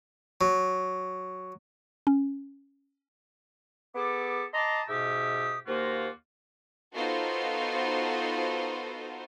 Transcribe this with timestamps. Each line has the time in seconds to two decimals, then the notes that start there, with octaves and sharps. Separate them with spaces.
0.41 F#3
2.07 C#4
3.95 B3 G#4 A4 D6
4.54 D#5 A5 A#5 C6 D6
4.89 G#2 B2 G4 E5 D#6
5.67 D#2 A#3 F4 F#4 C5
6.94 B3 D#4 F4 F#4 A4 C5